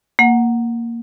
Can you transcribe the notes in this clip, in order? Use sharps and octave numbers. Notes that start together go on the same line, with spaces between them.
A#3 F#5